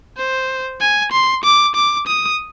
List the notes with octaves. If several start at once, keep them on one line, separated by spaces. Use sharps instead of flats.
C5
G#5
C6
D6
D6
D#6